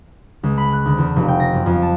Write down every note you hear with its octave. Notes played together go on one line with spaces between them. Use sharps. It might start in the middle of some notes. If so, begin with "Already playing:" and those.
C#2
B5
F#6
D2
E2
F1
G5
A#6
F#2
F2
A5